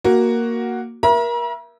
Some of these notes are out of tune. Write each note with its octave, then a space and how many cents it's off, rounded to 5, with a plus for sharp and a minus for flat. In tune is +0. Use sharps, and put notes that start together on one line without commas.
A#3 +0 F#4 +0
A#4 +25 E5 +20 A#5 +45